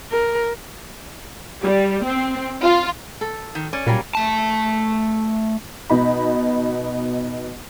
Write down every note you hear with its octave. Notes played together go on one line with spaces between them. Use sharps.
A#4
G3
C4
F4
A4
D#3
C#4 D5
A#2 F#3 G3 A#3
A3 A5
B2 D#4 B5